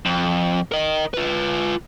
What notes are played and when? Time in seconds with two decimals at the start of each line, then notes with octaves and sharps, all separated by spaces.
0.06 F2
0.72 A#4 D#5
1.14 F4 B4